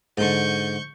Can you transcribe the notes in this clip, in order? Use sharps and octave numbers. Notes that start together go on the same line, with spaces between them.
G#2 D3 C#6 G6